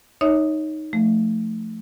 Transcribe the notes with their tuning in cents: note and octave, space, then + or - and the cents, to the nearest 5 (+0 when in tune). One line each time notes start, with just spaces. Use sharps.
D#4 +0 C#5 +10 E5 -35
F3 -5 A3 +0